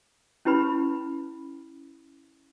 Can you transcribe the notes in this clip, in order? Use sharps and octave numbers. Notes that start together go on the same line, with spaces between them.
C#4 E4 G4 B4 B5